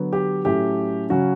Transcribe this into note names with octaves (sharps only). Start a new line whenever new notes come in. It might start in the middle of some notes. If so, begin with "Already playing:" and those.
Already playing: D3 F#3 B3
G4
A2 F#3 A3 C#4 G4
C#3 F#3 C#4 F#4